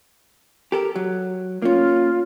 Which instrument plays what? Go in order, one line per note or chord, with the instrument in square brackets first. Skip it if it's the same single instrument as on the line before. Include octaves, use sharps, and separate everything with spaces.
[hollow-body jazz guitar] G4 A4 A#4
F#3
[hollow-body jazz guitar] A#3 C#4 [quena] F4